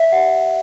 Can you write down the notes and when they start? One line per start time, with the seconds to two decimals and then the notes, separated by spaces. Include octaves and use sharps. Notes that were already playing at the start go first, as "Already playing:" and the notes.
Already playing: D5 E5
0.12 G4 F#5